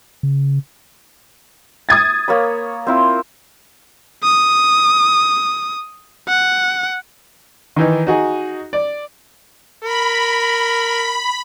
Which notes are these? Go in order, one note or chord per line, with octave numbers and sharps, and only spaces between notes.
C#3
D#6 G#6 A6
A#3 C#5 B5
C4 E4 F4
D#6
F#5
D#3 E3 D#4
D#4 F#4 G#4
D5
A#4 B5